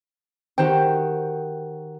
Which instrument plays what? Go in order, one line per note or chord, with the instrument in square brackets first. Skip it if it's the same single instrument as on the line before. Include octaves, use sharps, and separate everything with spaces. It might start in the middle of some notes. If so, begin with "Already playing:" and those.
[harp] D#3 D#4 F#4 [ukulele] G4 C5 G5